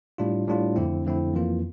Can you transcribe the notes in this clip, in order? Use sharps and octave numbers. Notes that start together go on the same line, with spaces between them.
A2 G3 D4 F4
A2 G3 D4 F4
F2 D3 A3 C4 E4
F2 D3 A3 C4 E4
F2 E3 A#3 F4